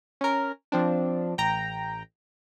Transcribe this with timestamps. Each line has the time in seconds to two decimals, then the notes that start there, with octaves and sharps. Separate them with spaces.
0.21 C#4 A#4
0.72 F3 C4 D4
1.38 A1 G5 A#5